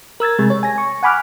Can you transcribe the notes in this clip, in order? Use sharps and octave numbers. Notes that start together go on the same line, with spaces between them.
A#4 E6 G#6 A6
C3 G#3
C#5
G#5 A#6
C#6
F#5 G#5 B5 D6 F6 F#6